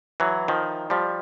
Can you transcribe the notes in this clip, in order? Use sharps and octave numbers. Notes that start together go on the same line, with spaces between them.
E3 F#3
D#3 F3
F3 G3